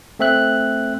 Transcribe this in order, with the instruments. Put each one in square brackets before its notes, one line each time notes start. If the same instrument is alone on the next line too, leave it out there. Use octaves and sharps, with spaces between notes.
[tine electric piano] A3 C4 E5 F#6